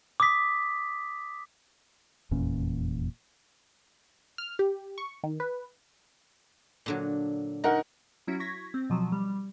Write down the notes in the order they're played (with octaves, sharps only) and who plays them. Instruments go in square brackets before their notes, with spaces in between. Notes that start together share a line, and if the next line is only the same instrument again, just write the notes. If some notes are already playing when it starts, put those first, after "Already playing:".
[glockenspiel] D6 D#6 B6
[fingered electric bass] F1 E2 A#2 C#4
[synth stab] F6
G4
C#6
D#3
B4
[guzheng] A#2 D3 F#3
[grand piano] D#4 A#4 F#5 [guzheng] F#4
[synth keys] F#3 C#4 E4 F#4
C#6 G#6 A#6 B6
C4
B2 F3 F#3
G3